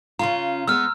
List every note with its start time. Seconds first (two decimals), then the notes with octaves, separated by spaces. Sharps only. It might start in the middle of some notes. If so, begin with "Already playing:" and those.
0.19 C#3 C#4 F4 A#5 C6
0.68 G#3 B3 E6 F6